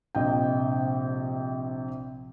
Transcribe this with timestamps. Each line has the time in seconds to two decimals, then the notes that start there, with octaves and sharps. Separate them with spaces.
0.15 A#1 C3 D#5 G5